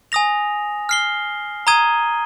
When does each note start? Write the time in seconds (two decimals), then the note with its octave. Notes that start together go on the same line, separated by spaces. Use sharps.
0.12 G#5 D#6 A#6 F7
0.89 F6 C7 G7
1.67 A#5 D#6 G#6 D#7 G7